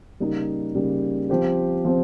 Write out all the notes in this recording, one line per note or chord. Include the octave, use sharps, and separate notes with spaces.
C#3 G3 A#3 D#4 G4
C#3 G3 A#3 D#4 G4
F3 C4 G4 C5
F3 C4 G4 C5